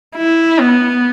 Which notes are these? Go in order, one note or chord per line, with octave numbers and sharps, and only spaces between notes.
E4
B3